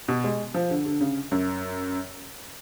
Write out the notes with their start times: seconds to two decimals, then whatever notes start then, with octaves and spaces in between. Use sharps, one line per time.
0.08 B2
0.24 G#3
0.54 F3
0.70 D3
0.86 D3
1.01 C#3
1.32 F#2